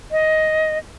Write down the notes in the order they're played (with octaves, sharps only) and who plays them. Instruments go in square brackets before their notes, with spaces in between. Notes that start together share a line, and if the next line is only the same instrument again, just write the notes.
[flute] D#5